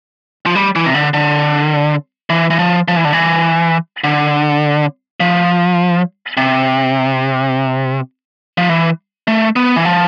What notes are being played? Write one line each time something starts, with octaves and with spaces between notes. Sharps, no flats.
F3
G3
E3
C3
D3
D3
E3
E3
F3
F3
E3
D3
E3
D3
F3
C3
F3
E3
A3
B3
E3
F3